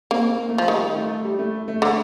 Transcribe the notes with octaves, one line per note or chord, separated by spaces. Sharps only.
A#3 C4
A#3
A3
F3
D#3 G3
A3
G3
A3
A3
D3